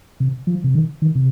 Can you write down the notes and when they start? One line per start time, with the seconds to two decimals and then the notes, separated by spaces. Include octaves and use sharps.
0.20 C3
0.47 F3
0.64 C3
0.75 D#3
1.02 D#3
1.15 C3